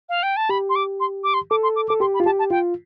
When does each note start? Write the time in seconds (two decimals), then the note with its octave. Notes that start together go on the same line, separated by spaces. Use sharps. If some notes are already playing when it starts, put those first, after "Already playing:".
0.09 F5
0.23 G5
0.36 A5
0.49 G4 B5
0.69 C6
0.75 D6
1.00 C6
1.24 D6
1.34 C6
1.50 A4 D6
1.63 C6
1.76 D6
1.88 A4 D6
2.00 G4 C6
2.14 B5
2.20 F4
2.25 G4 A5
2.39 A5
2.51 F4 G5